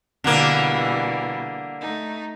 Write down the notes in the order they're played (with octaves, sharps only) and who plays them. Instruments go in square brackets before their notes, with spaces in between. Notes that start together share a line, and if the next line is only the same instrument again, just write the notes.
[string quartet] B2 E3 G3 [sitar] D3 A#3
[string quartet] A3 D#4